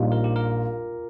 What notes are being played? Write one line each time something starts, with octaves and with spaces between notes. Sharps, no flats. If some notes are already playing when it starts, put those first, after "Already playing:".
Already playing: A#1 A#2 G3 D#4 F4
A#4
G4
A#4